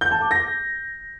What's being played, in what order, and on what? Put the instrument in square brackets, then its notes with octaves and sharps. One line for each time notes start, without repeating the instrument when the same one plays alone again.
[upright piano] G6
A5
D6
A#6